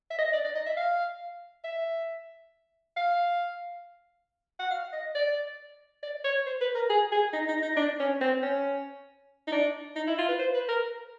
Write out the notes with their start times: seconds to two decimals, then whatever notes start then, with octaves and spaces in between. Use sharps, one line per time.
0.10 E5
0.18 D#5
0.33 D5
0.44 D5
0.55 D#5
0.66 E5
0.77 F5
1.64 E5
2.96 F5
4.59 F#5
4.71 F5
4.93 D#5
5.15 D5
6.03 D5
6.24 C#5
6.46 C5
6.61 B4
6.75 A#4
6.90 G#4
7.12 G#4
7.33 D#4
7.48 D#4
7.62 D#4
7.77 D4
8.00 C#4
8.21 C4
8.43 C#4
9.47 D#4
9.52 D4
9.96 D#4
10.07 E4
10.18 F4
10.28 B4
10.39 C5
10.54 B4
10.69 A#4